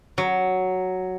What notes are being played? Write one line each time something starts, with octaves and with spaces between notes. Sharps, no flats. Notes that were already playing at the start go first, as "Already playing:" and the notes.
F#3